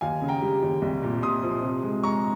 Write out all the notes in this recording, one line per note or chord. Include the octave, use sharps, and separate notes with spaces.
D#2 F5 G#5
C#3
G5 A#5
G3
D#2
C2
A#2
A#2 C6 D#6
F3
C3
G#3
G#3 A#5 C#6